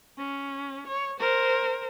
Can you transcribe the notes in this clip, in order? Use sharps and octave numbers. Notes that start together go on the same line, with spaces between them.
C#4
C#5
A#4 C5